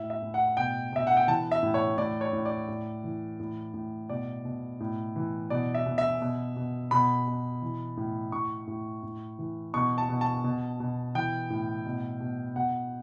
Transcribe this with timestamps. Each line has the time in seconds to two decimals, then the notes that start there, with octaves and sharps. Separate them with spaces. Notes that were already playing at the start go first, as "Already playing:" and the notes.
Already playing: A2 E5
0.10 E5
0.22 A2
0.34 F#5
0.57 B2 G5
0.92 B2 E5
1.07 F#5
1.17 G5
1.28 E3 A5
1.51 E5
1.63 A2
1.74 C#5
1.98 A2 D5
2.21 C#5
2.33 A2
2.45 D5
2.68 A2
3.04 E3
3.40 A2
3.74 A2
4.09 B2 D5
4.45 B2
4.80 A2
5.16 E3
5.50 B2 D5
5.75 E5
5.86 B2
5.98 E5
6.22 B2
6.56 B2
6.91 B2 B5
7.28 B2
7.62 E3
7.97 A2
8.32 A2 C#6
8.67 A2
9.03 A2
9.39 E3
9.74 B2 C#6
9.98 A5
10.09 B2
10.21 A5
10.44 B2
10.80 B2
11.15 E3 G5
11.50 A2
11.86 B2
12.20 B2
12.56 B2 F#5